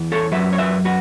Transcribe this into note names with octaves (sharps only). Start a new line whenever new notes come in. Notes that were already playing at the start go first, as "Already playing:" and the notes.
Already playing: E2 E3
A4 C#5
F#2 F#3 B4 E5
C#5
B4 E5
F#4 B4